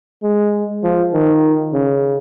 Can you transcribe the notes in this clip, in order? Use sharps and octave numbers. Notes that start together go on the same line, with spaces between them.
G#3
F3
D#3
C#3